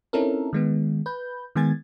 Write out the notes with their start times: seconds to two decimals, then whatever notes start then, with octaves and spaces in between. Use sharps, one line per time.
0.13 C4 C#4 D#4 E4 A4 A#4
0.53 D#3 G#3 B3
1.06 B4 G6
1.55 D#3 G#3 B3 G#5 G#6 A6